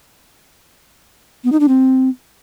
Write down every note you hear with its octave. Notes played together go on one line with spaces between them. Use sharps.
B3
D#4
D4
C4